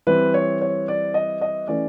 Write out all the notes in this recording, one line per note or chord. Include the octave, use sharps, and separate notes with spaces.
E3 G3 C4 B4
C#5
C#5
D5
D#5
D#5
E3 A3 C#4 D5